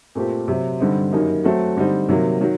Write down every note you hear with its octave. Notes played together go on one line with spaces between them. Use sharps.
A#2 A3 C4 G4
C3 F#3 C4
G2 D3 G3 C4 D#4
F#2 D#3 G3 A#3 D#4
F#3 A3 C4 F#4
D3 G3 C4 D#4
C3 D#3 F#3 A#3
D#3 F#3